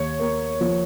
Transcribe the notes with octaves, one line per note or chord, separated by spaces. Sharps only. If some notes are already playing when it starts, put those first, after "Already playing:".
Already playing: D#2 C#5
A#3
F3